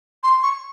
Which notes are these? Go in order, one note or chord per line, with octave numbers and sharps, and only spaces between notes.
C6
C#6